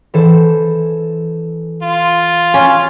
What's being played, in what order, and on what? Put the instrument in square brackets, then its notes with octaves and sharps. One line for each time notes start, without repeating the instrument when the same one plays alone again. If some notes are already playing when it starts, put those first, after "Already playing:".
[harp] E3 A4 C5
[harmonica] F4
[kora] C#4